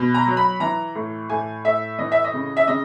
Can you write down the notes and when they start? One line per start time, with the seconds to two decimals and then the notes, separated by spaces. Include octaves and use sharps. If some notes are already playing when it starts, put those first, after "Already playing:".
Already playing: B2
0.14 A#5
0.26 F#3
0.37 B5
0.60 E3 A#5
0.95 A2
1.30 A2 G#5
1.64 A2 E5
1.99 E3 D#5
2.12 E5
2.24 D#5
2.33 C#3
2.57 E5
2.67 C#3 D#5